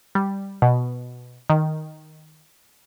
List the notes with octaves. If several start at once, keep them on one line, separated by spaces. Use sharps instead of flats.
G3
B2
D#3